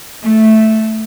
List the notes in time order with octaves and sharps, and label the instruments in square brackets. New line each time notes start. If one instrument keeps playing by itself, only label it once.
[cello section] A3